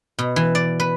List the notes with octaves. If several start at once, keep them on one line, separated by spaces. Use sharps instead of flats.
B2
E3
D5
B4